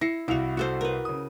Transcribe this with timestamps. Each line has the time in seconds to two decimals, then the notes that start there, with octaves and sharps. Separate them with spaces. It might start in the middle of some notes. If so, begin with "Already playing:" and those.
0.01 E4 A#6 C7 C#7
0.28 C2 E4 F#4 F5 F7
0.57 F#4 A4 C5
0.81 A#4 B4
1.05 C#3 D#6